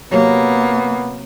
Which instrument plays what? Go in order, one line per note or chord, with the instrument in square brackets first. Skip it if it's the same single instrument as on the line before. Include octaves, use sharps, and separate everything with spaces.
[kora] C3 F#3 [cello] A#3 [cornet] B3